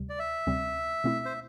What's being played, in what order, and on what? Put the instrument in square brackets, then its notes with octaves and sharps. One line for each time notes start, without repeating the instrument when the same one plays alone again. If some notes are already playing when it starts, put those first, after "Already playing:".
Already playing: [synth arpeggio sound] D2 C3 G3
[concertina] D5
E5
[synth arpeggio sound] D2 C3 G3 C4
B2 A3 C4 E4
[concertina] C5